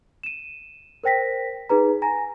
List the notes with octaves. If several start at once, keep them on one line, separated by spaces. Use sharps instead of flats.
D#7 E7
A#4 C5 G5 A#6 B6
D#4 G#4 B4 A#5
G#5 A#5 A#6